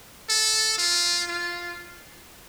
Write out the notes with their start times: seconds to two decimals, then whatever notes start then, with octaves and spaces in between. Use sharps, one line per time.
0.29 A4
0.78 F4
1.28 F4